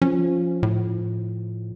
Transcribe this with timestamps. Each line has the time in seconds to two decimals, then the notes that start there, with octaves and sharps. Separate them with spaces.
0.02 F3 C#4
0.63 A2